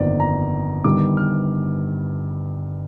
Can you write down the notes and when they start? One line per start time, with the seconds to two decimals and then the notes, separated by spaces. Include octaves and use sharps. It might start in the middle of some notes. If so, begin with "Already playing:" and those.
Already playing: G1 F2 D#3 A#3 D5
0.20 A#5
0.84 G1 G2 D#3 G3 D6
1.17 F6